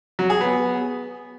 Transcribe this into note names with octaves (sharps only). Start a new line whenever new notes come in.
F#3
G#4
B3